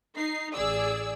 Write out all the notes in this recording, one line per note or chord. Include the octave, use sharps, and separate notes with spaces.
D#4 C7
A1 G#4 D5 E6